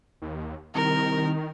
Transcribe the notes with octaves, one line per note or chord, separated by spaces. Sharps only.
D#2
C2 D#3 A#4